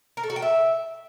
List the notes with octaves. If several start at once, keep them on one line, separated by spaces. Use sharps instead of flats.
A#4
A4
F#4
G5
E5